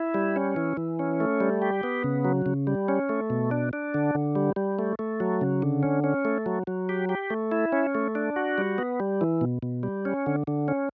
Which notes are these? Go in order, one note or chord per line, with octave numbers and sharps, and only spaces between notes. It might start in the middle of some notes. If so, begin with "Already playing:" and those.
Already playing: E4
G3
C#4
E3
E3
C#4
A3
G3
G4
B3
C#3
F#3
C#3
G3
C#4
A3
B2
D4
D4
D3
D3
G3
G3
A3
A3
F#3
C#3
D3
C#4
C#4
A3
F#3
F#3
G4
G4
A3
E4
C#4
A3
D4
F#4
G3
B3
G3
E3
B2
B2
G3
C#4
D3
D3
C#4